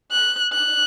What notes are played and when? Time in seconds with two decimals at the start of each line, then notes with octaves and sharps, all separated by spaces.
0.11 F#6
0.53 F#6